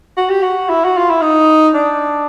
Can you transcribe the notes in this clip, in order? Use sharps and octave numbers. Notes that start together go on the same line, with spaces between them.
F#4
G4
F#4
E4
F#4
F4
E4
D#4
D4